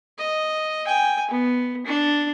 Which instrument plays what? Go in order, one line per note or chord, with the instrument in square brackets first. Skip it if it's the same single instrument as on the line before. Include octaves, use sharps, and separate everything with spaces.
[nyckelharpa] D#5
G5 G#5
B3
D4